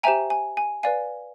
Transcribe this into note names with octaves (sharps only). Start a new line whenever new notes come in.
G4 C5 E5 G5 G#5 A#5
G#5
G#5
B4 D5 F5 G#5